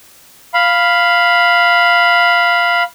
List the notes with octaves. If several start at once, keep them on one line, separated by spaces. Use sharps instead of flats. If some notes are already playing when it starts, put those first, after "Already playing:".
F5 B5